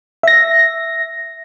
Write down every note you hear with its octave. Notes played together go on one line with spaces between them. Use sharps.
E5 A#6